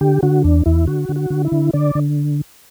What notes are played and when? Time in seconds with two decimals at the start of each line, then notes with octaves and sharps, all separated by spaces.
0.01 D3 G4
0.23 D3 F#4
0.44 E2 D4
0.66 E2 E4
0.87 D3 F#4
1.09 D3
1.16 F#4
1.30 D3
1.45 E4
1.52 D3
1.73 D3 D5
1.95 D3